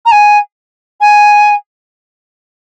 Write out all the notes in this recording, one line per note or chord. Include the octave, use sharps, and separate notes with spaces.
A#5
G#5
G#5